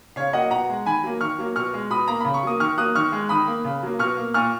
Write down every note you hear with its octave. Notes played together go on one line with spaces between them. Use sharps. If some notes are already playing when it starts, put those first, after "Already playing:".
C#3 C#5 F5
F#3 A#3 D#5 F#5
B2 F#5 A#5
G#3
D#3 G#5 B5
F#3 A#3
D#3 C#6 F6
F#3 A#3
B2 C#6 F6
G#3
B2 B5 D#6
A#3 A#5
C#3 B5
C#6
F#3 A#3 D#6
D#3 C#6 F6
F#3 A#3 D#6 F#6
D#3 C#6 F6
G#3
D#3 B5 D#6
A#3
C#3
F#3 A#3
B2 C#6 F6
A#3
A#2 C#6 F6